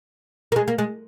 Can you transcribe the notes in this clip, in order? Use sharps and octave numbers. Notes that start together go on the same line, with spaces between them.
A#3
G#3
A#3
G#3